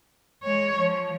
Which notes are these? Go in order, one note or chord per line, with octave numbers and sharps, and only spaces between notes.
G#3 C#5
F3